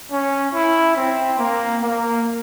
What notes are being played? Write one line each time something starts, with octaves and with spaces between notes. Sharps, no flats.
C#4
E4
C4
A#3
A#3